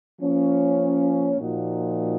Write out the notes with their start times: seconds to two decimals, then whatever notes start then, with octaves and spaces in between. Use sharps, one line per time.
0.21 F3 A#3 C#4
1.40 A#2 F3 A#3 D#4 F#4